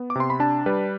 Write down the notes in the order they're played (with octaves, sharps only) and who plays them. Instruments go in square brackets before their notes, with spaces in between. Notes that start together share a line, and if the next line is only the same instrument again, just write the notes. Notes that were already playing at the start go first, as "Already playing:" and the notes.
Already playing: [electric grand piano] B3
D6
C3 C6
B5
D4 A5
G3 B4